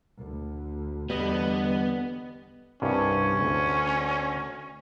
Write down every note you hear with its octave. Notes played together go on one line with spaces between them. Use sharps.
D2
E2 D3 G3 B3 D#5 B5
C2 G2 C#4
D2